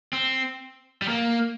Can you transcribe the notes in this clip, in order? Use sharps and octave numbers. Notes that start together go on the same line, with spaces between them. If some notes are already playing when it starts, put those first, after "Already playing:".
C4
G3
A#3